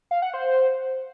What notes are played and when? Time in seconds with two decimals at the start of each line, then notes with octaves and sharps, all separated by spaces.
0.11 F5
0.22 F#5
0.34 C5